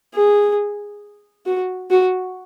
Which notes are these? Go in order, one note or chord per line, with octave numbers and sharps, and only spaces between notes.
G#4
F#4
F#4